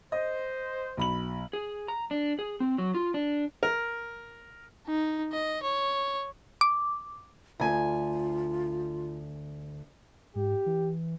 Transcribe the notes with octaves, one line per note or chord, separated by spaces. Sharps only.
C5 D#5
B1 B5 F#7
G#4
A#5
D4
G#4
C4
F#3
F4
D4
A#4
D#4
D#5
C#5
D6
D2 F4 G#5
G#2 G4
E3